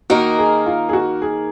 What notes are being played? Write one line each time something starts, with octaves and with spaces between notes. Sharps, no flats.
D#3 A#3 D#4 F#4 A#4
G#4
F4
G#4
F#4
G#4